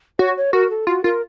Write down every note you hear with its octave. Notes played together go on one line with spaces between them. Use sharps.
F#4 C#5
C#5
F#4 A#4
A4
F4 F#4
F4 A#4